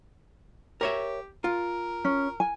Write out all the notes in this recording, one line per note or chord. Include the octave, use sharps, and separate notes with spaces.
G4 A#4 C#5 E5
F4 A#4
C#4
G#5